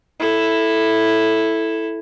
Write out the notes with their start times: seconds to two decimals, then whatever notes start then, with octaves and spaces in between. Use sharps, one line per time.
0.20 E4 A4